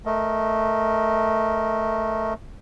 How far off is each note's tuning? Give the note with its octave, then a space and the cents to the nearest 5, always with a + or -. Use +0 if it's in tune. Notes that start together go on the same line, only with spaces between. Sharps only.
A3 +0 A#4 -5 D#5 +15